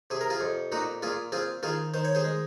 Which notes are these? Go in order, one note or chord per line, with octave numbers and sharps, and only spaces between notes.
C3 G#4
A#4
F4 G#4
F2
A#2 D#4 F#4
A#2 F4 G#4
C4 F4 G#4
D#3 F4 G#4
D#3 C5
C#5
G#4 C5
G#3